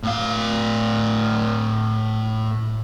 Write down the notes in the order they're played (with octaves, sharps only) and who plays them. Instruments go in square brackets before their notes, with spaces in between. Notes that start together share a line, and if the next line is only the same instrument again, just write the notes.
[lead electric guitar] A2 F5